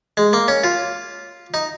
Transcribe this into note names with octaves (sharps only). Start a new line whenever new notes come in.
G#3
A#3
C#4
F4
D#4